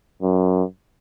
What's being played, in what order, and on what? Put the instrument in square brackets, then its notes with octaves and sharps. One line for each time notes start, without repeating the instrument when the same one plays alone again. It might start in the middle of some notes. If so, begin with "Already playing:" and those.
[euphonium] F#2